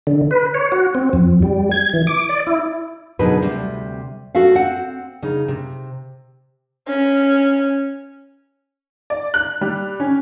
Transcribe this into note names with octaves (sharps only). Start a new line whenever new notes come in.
D3
B4
C#5
F#4
C4
F2
G3
G#6
E3
D6
D5
E4
B2 D3 F#3 D#4 G#4 B4
D2 C3 G3
F#4 A4 E5 F5
C4 F#5
C#3 D#4
C3
C#4
D5
F#6
G3
C#4